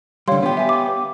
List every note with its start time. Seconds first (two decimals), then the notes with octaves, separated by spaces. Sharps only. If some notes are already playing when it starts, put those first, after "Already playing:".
0.28 D3 G3 C#5 F5 C6
0.43 B3 G4
0.57 E5 G#5
0.69 D6